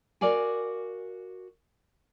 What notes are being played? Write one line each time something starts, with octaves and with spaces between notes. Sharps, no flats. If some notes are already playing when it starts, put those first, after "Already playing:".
F#4 A#4 D5 F5 G#5